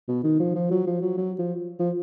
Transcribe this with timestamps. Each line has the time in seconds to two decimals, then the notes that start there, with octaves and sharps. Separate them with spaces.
0.08 B2
0.24 D#3
0.40 F3
0.55 F3
0.71 F#3
0.87 F3
1.02 F#3
1.17 F#3
1.39 F3
1.80 F3